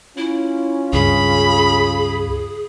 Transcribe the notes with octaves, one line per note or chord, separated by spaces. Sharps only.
C#4 E4 F4
C#2 G2 G#4 B5